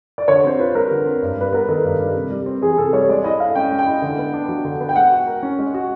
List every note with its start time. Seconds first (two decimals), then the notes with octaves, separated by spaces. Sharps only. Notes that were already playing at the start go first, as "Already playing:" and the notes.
0.18 D5
0.28 D3 C#5
0.44 C4 C5
0.59 F4 B4
0.75 G3 A#4
0.91 D3
1.06 C4
1.22 G2
1.38 G3 B4
1.53 B3 A#4
1.68 D#3 A4
1.84 G2
2.00 G3
2.16 C3
2.31 G3
2.46 C4
2.62 E3 G#4
2.77 C3 A4
2.93 G3 C#5
3.09 G#3 D5
3.24 E4 D#5
3.40 A4 F5
3.55 C#4 G5
3.71 G#3
3.79 G5
3.86 E4
4.02 D3
4.18 B3
4.34 D4
4.49 F#3
4.65 D3
4.80 B3
4.89 G5
4.96 G#3 F#5
5.11 F#4
5.27 A#4
5.43 C#4
5.59 G#3
5.74 F#4